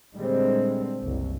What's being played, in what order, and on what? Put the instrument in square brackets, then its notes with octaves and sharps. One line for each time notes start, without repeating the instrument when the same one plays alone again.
[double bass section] A#2 D3 G3 G#3 C4
F#1 C2